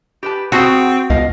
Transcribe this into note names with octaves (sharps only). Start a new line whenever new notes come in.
G4 B4 A5
C4 F#4 G#4 A5
C#2 B2 D#5 F5